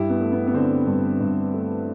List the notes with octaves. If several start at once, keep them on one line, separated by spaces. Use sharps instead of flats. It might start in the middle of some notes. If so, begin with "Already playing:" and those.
Already playing: G2 E4 G4
B3
A3
B3
B3
D3 C4
G2
G2
A3